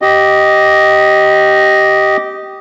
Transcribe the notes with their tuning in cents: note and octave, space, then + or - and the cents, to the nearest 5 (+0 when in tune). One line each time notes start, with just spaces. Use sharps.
G4 -15 D#5 +0